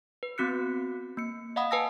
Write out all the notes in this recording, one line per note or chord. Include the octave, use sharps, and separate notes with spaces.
B4
B3 C4 F#4 F#6 C#7
A#3 C#7
D#5 F5 F#5 B5 D#6
B4 G#5 A5 E6 A#6